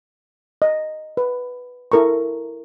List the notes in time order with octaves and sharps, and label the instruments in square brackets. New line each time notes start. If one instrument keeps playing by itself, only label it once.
[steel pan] D#5
B4
E4 A4 A#4 A#5 C#6